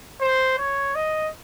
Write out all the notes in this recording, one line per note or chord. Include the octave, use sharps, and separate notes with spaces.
C5
C#5
D#5